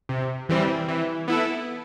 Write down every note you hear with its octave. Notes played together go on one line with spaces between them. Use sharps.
C3
E3 G3 C4
E3
B3 E4 A4